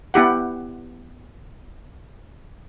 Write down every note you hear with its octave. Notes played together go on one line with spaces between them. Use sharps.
B3 E4 G4 F#5